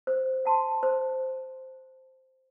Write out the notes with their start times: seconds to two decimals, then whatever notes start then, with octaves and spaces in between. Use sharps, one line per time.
0.07 C5
0.45 F#5 A5 C6
0.83 C5